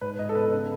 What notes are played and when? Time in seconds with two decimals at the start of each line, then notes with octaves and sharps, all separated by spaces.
0.01 G#2 B4
0.19 G#2 D#5
0.29 A4
0.35 B3 B4
0.52 C#3